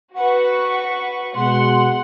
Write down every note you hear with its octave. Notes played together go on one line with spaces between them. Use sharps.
F#4 B4 F#5 C#6
B2 G#3 F#5 C6